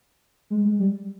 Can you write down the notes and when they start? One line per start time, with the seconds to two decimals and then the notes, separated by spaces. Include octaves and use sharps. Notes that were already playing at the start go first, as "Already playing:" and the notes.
0.50 G#3
0.65 G#3
0.79 G3